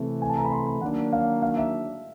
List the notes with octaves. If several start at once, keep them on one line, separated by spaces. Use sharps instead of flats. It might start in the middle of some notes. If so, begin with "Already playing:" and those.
Already playing: C3 E3 A3
G#5
A5
A#5
B5
C6
B5
D#3 F#3 A#3 D4 F#5
F5
F5
E5